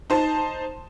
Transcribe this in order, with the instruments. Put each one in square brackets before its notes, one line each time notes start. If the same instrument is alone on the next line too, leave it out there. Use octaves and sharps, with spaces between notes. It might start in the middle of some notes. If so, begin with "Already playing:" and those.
[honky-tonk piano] D#4 C5 A5